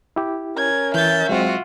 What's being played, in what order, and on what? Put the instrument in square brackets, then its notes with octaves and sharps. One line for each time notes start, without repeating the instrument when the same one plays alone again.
[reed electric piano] E4 G4
[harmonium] C#4 A#4 [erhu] G#6
[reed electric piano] E3 [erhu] E5 [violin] G6 A6
[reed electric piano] F#3 G#3 C4 [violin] F4 F#4